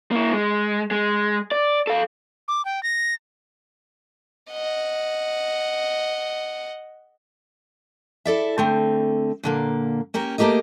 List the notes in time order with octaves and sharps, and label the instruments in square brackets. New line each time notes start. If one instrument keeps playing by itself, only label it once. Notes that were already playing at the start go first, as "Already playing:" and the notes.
[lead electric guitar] A#3 E4
G#3
G#3
D5
A4 F5
[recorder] D6
G5
A#6
[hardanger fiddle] D#5 F#5
[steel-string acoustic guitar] E4 A4 D5 E5
D3 A3 C4
A#2 D3 A#3
A#3 C#4 G4 A#4
A3 A#3 G4 A#4 D#5